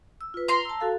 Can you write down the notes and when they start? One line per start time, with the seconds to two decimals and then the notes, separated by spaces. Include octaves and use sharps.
0.21 E6
0.34 F4 B4
0.48 A#5 C6
0.65 A5 E6
0.81 F#4 A4 F5